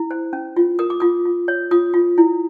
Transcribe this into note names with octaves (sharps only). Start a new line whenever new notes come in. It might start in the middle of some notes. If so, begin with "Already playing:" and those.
Already playing: E4
C5
C#4
F4
A#4 D#6
D6
F4 D#6
F4
C#5
F4 D#6
F4
E4